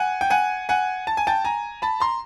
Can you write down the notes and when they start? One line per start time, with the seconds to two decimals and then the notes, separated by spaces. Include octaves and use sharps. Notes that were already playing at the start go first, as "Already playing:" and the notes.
Already playing: F#5 G#5
0.21 G5
0.30 F#5 G#5
0.69 F#5 G#5
1.07 A5
1.17 G#5
1.27 G5 A5
1.45 G#5 A#5
1.82 A5 B5
2.00 A#5 C6